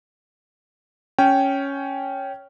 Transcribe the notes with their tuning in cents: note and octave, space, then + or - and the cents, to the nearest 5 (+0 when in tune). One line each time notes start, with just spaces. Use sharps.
C#4 +0 C#5 +0 G5 -10